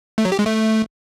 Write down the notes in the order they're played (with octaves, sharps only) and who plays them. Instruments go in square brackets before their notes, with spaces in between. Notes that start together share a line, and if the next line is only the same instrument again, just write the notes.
[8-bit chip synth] A3
F#3
G4
G#3
A3